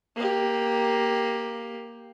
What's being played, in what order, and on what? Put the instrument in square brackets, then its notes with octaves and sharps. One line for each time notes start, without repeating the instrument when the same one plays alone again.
[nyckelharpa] A#3 G4